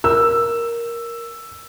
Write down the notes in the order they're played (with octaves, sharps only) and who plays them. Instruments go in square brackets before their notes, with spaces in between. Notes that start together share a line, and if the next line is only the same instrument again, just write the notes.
[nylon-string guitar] A#4 [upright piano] E6